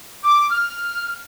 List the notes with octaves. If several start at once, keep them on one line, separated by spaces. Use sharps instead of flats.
D6
F6